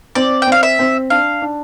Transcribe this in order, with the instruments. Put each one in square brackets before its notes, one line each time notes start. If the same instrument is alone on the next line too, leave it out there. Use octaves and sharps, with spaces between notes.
[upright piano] C4 [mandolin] D5
[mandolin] G5
[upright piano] C4 [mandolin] F5
[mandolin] E5
[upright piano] C4
[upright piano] D4 [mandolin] F5
[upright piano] D4